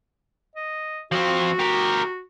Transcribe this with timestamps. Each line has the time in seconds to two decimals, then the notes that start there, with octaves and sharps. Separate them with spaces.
0.56 D#5
1.12 F3 C4 F#4
1.59 G4 A#4